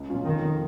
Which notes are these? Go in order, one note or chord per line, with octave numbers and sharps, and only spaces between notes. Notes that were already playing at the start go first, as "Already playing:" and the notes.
Already playing: C#2
B2 F#3 C#4 F4
F2 D#3
F3 A#3